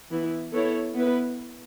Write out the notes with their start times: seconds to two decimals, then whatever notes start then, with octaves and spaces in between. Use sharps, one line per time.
0.11 E3 B3 E4
0.53 B3 E4 A4 C#5
0.95 B3 E4 B4